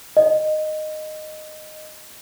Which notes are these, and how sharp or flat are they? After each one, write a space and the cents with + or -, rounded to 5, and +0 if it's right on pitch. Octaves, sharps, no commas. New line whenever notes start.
D#5 -10